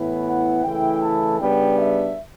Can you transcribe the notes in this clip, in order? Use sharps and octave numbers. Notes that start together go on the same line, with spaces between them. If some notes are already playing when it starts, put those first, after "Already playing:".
Already playing: A2 E3 B3 E4
F#5
C#3 E3 A3 E4 G5
A5
C#3 G3 B3 D4 G5
E5